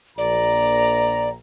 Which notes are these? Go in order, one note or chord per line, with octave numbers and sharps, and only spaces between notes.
A#1 D5 A#5